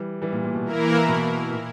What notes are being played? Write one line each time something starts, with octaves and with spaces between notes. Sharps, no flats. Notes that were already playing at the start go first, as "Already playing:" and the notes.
Already playing: E3 G3
E3 G3
A#2
A#2
B2
E3 A#3 E4 A#4
B2
A#2